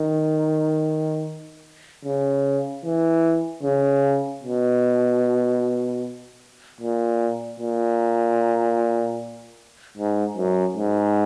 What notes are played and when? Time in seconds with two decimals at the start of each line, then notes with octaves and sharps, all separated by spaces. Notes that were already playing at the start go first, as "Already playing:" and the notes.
Already playing: D#3
2.05 C#3
2.85 E3
3.63 C#3
4.43 B2
6.80 A#2
7.60 A#2
9.97 G#2
10.37 F#2
10.77 G#2